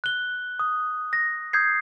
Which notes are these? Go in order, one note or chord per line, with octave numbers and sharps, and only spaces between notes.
F#6 G7
D#6
A#6
D#6 G6 G#6 C7